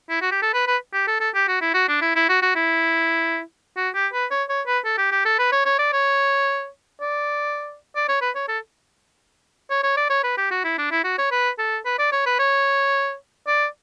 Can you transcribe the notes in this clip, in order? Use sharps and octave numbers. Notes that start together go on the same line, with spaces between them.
E4
F#4
G4
A4
B4
B4
G4
A4
A4
G4
F#4
E4
F#4
D4
E4
E4
F#4
F#4
E4
F#4
G4
B4
C#5
C#5
B4
A4
G4
G4
A4
B4
C#5
C#5
D5
C#5
D5
D5
C#5
B4
C#5
A4
C#5
C#5
D5
C#5
B4
G4
F#4
E4
D4
E4
F#4
C#5
B4
A4
B4
D5
C#5
B4
C#5
D5